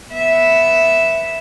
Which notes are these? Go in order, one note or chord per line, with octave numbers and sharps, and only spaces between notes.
B3 E5